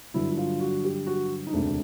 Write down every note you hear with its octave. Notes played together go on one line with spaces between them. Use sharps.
G2 D3 F#3 E4
E4
F4
F#4
G4
F#4
D#4
E1 D2 C3 D4